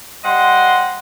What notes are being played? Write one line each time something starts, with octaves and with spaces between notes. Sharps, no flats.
G3 C5 D#5 F#5 G5 C6